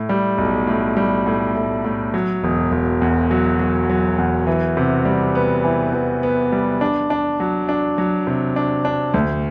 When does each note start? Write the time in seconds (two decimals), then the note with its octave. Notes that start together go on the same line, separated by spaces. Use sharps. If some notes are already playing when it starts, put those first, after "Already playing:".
Already playing: A2
0.09 G3
0.38 B1
0.67 A2
0.97 G3
1.27 A2
1.56 A2
1.84 A2
2.14 F#3
2.44 E1
2.72 E1
3.02 E2
3.31 F#3
3.59 F#3
3.90 F#3
4.18 E2
4.47 E3
4.77 C3
5.05 G3
5.35 B3
5.64 E3
5.93 E3
6.23 B3
6.52 G3
6.81 D4
7.10 D4
7.40 F#3
7.69 D4
7.98 F#3
8.27 C3
8.56 D4
8.85 D4
9.14 D2